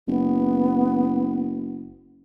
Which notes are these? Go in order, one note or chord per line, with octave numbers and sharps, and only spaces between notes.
F#1 B3